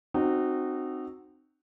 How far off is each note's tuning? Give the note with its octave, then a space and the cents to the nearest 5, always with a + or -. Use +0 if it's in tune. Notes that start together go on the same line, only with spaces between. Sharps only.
C4 +0 D#4 -25 F#4 +0